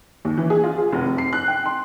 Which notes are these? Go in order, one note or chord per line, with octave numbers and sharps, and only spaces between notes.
D#2
E3
G#4
F4
G#4
F1
F1
C7
F#6
G5
C6